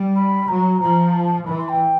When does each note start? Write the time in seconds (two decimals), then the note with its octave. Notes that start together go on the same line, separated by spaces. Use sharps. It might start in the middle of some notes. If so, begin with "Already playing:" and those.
Already playing: G3
0.16 B5
0.48 F#3 A#5
0.80 F3 A#5
1.14 A5
1.25 A5
1.46 E3 B5
1.57 C6
1.68 G5